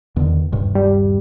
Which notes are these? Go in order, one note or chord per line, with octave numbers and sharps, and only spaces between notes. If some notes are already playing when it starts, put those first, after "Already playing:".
E2 D3 D#3
D#1 G2 C3
G3